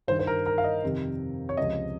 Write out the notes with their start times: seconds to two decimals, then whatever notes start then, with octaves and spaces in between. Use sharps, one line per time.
0.08 G2 D#3 C5
0.19 C5
0.27 A#4
0.46 A#4
0.58 F5
0.64 D#5
0.84 F2 C3 D#3
1.49 C#5
1.57 C#2 C3 F3 D#5